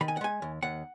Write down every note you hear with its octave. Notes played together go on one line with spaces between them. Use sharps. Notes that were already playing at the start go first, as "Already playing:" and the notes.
D#3 B5
G#5
F#5
G#3 G#5
D#2
D#2 F#5